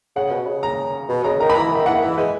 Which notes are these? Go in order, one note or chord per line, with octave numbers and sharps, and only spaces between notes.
C#3 F#5
B2
C#3
A#5
B2
C#3 A#5
D#3 A#5
B5
E3 A#5
D#3 E5
E3 F#5
D#3
E3 E5
G#3 B4